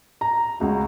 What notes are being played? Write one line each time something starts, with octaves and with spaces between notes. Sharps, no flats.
A#5
C#2 F#4